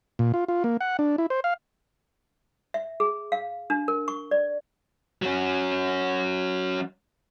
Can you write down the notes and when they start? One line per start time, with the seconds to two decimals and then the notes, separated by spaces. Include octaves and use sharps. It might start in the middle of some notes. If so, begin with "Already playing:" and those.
0.19 A#2
0.34 F4
0.48 F4
0.64 A#3
0.81 F#5
0.99 D4
1.18 E4
1.30 C5
1.44 F5
2.74 E5
3.00 G#4
3.32 F5
3.70 D4
3.88 A#4
4.08 C#6
4.31 D5
5.22 F#3 C#4